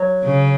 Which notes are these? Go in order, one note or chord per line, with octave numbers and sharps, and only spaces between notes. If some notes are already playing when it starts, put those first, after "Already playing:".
Already playing: F#3
C#3